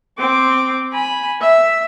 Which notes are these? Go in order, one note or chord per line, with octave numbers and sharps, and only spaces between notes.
C4 D6
G#5 B5
E5